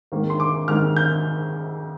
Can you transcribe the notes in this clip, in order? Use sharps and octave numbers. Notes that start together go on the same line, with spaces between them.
G#2 D#3 A#3
C6
D6
G#2 D#3 A#3 F6
G6